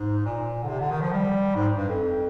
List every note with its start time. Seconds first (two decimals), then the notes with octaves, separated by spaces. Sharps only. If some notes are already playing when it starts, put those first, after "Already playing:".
Already playing: G#2
0.25 A#2
0.63 D3
0.68 C3
0.79 D3
0.91 D#3
1.01 F3
1.13 G3
1.55 G#2
1.77 G2
1.89 F2